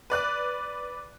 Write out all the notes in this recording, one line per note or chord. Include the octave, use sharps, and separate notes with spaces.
B4 D5 F#6